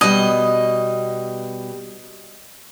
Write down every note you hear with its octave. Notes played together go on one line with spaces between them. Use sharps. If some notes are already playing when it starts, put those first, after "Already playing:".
B2 G3 D#5